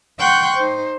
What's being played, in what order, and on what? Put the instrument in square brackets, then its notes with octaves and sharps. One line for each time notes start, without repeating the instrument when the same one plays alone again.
[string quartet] F#5 G5 C6 C#6 F#6 G6
D#4 C5